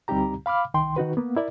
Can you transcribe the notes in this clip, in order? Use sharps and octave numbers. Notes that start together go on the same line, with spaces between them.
D2 G3 C4 D#4 G4 A#5
F5 B5 D6 F6
C2 D#3 G5 C6
D#3 D#4 F#4 B4
A#3 B3
E4 A#4 D5 E5